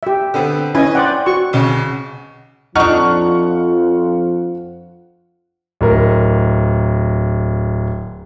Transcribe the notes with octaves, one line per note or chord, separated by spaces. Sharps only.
G4 E5
D3 B3 C4
C#4 E4 B4 D#5 G#5
C5 D5 F#5 G5
F#4 C#6
B1 C#3
F2 F3 D4 D#4 F#5 C#6 F6
D1 A#4